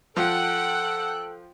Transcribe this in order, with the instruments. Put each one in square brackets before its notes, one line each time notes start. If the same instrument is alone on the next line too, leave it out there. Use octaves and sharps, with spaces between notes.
[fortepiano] F3 [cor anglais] A4 [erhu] F#5 [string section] G5 F#6